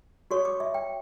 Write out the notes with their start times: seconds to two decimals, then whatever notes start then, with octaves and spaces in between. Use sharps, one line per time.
0.31 F#4 A4 C#5 C#6
0.45 D6
0.60 E5
0.74 G5